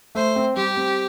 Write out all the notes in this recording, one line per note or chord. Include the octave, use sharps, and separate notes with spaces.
A3 C5
C4
G3 G4
C4